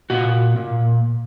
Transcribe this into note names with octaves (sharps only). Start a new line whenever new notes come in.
A#2 F#4
A#2